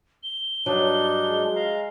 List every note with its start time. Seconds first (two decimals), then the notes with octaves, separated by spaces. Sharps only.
0.23 G7
0.66 G2 F#3 D4 D#4
1.24 G#3
1.56 F5 A#5